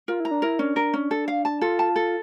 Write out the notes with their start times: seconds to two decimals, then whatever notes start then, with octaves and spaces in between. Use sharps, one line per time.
0.08 F4 A#4
0.20 E4 A#5
0.31 D4
0.42 E4 A#4
0.59 C#4 D4
0.76 A#4
0.94 C#4
1.11 A4
1.28 F5
1.45 A5
1.61 F4 A4
1.79 A5
1.96 A4